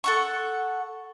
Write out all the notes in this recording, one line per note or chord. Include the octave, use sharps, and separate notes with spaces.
A4 F#5 C#6